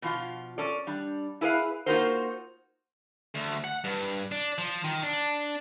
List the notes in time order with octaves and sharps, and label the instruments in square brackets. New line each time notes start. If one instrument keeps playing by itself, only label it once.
[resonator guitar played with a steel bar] B2 F3 F4
C#4 A4 D5
G3 D4
E4 G#4 B4 D5 F5
A#3 D#4 F4 F#4 A#4 C5
[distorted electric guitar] D2
F#5
G2
D4
F3
D#3
D4